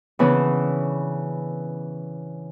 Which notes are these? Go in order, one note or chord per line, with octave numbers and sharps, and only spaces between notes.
C#3 E3 B3 C#4 D4